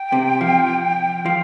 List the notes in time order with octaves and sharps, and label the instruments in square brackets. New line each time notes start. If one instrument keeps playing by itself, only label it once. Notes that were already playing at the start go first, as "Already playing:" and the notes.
Already playing: [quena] G5
[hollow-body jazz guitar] C3
F3
F3